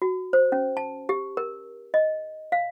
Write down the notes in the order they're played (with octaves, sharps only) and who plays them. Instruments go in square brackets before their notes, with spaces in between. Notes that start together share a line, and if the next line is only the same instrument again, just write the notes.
[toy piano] F#4
C5
C#4
A5
G4
A#4
D#5
F5